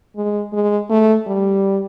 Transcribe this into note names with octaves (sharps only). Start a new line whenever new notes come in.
G#3
G#3
A3
G3